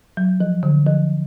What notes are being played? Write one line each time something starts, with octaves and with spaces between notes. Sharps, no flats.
F#3
F3
D3
F3